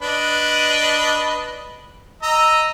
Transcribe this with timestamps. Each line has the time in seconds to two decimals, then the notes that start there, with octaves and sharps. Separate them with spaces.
0.02 D4 B4 D#5
2.22 D#5 A#5 E6